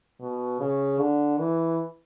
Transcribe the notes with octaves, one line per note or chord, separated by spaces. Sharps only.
B2
C#3
D3
E3